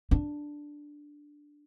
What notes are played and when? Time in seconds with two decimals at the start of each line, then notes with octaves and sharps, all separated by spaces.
0.11 D4